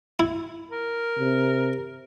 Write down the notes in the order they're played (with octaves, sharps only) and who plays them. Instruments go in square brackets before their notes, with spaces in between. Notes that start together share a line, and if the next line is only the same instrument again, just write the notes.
[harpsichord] E4
[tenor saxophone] A#4
[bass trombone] C3